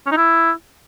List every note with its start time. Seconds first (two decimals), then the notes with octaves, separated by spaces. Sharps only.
0.07 C#4
0.12 D#4
0.17 E4